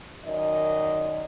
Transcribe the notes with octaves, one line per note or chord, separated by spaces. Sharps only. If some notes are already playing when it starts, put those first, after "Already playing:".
F#2 D#3 A#4 D5 D#5